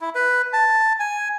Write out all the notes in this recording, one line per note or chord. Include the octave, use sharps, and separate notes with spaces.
E4
B4
A5
G#5